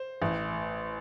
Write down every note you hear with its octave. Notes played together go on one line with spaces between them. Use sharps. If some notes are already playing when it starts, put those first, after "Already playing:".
Already playing: C5
A1